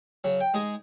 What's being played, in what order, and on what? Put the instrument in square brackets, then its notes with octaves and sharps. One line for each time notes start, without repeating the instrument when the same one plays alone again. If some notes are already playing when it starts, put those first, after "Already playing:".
[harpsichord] C#3 F#3
G5
G#3 D#4 G#4 D#5